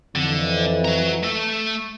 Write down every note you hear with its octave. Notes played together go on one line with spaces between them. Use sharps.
F2 D3 E3
F#4 A#5
A3 A4